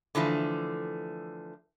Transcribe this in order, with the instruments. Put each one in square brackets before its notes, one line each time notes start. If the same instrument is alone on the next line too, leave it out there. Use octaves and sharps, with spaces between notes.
[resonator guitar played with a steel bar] D3 E3 F3 A3